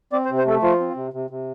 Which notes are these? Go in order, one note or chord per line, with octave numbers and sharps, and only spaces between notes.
C4 D5
C5
C3
C5
A3 A4
F3 F4
C4
C3
C3
C3